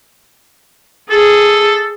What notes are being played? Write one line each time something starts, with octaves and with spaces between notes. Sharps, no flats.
G#4 A4